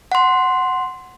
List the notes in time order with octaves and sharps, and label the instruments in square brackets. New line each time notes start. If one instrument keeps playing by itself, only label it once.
[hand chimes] F#5 C6